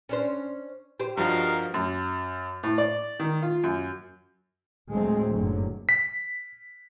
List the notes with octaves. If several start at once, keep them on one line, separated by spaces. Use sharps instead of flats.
C#4 D4 C5
G4 C5
G2 F3 D#4 F#4 A#4 F5
F#2
A2
D5
D#3
F4
F#2
D2 A2 F#3 G#3 A3 C4
F#1 G2 D3 F#3
B6